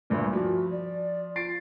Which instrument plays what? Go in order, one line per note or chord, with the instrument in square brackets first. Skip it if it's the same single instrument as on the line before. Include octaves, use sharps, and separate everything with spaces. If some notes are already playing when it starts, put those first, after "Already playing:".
[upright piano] D2 G2 A#2
[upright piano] F3 [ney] F#4
[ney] D5
[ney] F4 [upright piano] A6 C7 D7